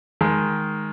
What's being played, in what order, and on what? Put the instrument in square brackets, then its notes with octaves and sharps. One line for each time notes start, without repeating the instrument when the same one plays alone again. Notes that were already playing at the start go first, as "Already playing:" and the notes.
[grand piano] D#3 G#3